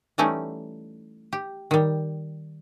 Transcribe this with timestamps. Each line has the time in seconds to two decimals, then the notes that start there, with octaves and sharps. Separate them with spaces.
0.18 E3 G3 A3 C#4 D#4 E4
1.33 G4
1.71 D#3 G3